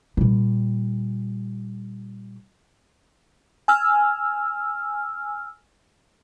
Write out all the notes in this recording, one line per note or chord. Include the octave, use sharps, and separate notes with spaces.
A#2 G3
G#5 E6 F6